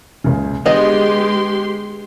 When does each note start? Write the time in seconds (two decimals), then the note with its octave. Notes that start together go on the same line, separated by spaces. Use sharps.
0.24 F#1 C#2 C#3
0.66 D3 G#3 B3 G4 G#4 D#5 C6